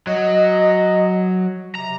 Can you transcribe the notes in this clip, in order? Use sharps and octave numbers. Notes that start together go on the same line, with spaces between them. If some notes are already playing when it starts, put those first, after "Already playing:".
F#3 D#5
C3 A#5